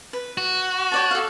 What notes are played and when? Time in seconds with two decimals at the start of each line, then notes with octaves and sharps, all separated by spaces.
0.13 B4
0.38 F#4
0.92 C#5 D5 A5
1.11 A4 F5